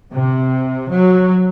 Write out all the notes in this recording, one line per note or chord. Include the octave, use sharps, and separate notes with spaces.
C3
F#3